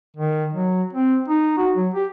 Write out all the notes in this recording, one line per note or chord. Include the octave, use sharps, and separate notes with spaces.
D#3
F#3
C4
D#4
F#4
F#3
G4